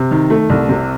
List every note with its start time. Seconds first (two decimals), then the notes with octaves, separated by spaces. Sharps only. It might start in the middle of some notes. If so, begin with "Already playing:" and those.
Already playing: C3
0.11 D#3
0.30 A3
0.50 C2
0.69 C3